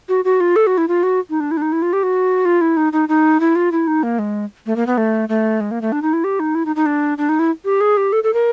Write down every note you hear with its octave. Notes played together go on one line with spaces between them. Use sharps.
F#4
F#4
F4
A4
F#4
E4
F4
F#4
D#4
D4
E4
D4
D#4
E4
F4
G4
F#4
F4
E4
D#4
D#4
D#4
E4
F4
E4
D#4
A#3
G#3
A3
A#3
B3
A3
A3
G#3
A#3
A3
D4
D#4
E4
G4
D#4
E4
D#4
D#4
D4
D4
D#4
E4
G4
G#4
G4
A4
A4
A#4